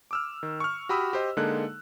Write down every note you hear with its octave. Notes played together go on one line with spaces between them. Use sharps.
D6 E6 F6
D#3
C#6 F6
F#4 G4 B5 D#6 E6
G4 C5 D#5
D3 G#3 A#3 D#4 A4 F#6